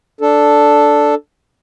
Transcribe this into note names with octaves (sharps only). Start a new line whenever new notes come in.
D4 A4